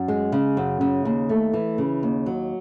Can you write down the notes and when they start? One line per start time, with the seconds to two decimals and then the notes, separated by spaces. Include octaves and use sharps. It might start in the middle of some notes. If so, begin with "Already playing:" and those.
Already playing: F#2
0.08 G#3
0.32 C#3
0.57 F#2
0.81 C#3
1.05 D#2
1.29 A3
1.53 E3
1.78 C#3
2.03 D#2
2.26 F#3